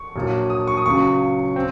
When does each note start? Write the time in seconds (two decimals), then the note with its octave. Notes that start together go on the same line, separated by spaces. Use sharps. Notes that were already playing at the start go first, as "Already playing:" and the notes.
Already playing: C#6
0.16 A#1 A#2 F#3
0.50 D#6
0.67 C#6
0.77 D#6
0.86 C#2 C#3 F#3 C#6
1.56 C4